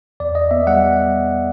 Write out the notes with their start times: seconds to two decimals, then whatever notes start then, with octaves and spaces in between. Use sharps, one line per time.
0.20 E2 D5
0.35 E2 D#5
0.51 B3 E5
0.67 G3 F#5